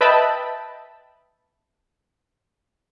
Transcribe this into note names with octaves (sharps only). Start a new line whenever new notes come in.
B4 D#5 E5 G5 A5 B5